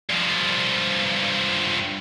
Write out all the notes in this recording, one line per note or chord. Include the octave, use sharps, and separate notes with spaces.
G2 F3